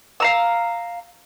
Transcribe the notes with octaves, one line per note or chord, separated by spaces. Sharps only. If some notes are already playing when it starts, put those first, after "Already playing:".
F5 A#5 E6